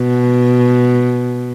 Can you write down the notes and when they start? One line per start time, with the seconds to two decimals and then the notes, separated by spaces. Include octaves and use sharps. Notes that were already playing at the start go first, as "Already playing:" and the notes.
Already playing: B2